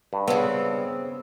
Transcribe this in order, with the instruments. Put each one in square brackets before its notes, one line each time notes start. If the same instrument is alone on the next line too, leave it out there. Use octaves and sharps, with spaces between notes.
[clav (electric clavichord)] G2
[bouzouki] C#3 C4 [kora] B3